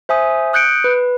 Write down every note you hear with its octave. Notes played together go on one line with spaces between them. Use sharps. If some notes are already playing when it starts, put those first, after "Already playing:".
C5 E5 G#5 D#6
D#6 F#6 G6 C#7 D7
B4